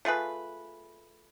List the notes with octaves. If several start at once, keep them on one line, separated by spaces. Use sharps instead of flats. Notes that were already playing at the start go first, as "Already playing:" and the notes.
A3 F4 G#4 B4